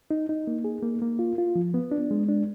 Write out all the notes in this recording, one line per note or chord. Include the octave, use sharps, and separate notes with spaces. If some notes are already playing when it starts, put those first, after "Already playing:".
D#4
D#4
A#3
G#4
A#3
A#3
F4
F4
F3
B3
D4
G#3
D4